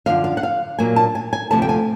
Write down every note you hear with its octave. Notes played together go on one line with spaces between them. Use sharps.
F#2 D3 F3 D4 F5
F5
F#5
F5
A#2 F#3 A#3 D4 G#5
A5
G#5
G#5
D2 C3 F3 A3 A5
G5
G#5